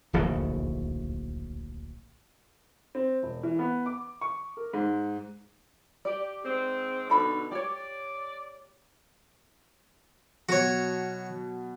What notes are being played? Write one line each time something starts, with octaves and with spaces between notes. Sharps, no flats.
D1 A#1 D#2 C#3
C4
E1
E3
B3
D6
C#6
A#4
G#2
G4 D5
G#2 C4
B2 D3 D#4 A4 B5
G4 C#5 D5
B2 F#3 F#4 C#5